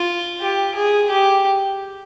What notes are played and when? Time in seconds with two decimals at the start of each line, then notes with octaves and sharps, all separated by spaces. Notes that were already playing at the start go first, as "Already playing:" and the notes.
Already playing: F4
0.41 G4
0.76 G#4
1.10 G4